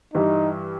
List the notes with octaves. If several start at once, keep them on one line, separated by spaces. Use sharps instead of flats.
G2 E3 G3 D#4